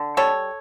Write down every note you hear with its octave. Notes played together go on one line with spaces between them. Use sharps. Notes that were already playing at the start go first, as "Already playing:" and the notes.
Already playing: D3
G3 A4 C#5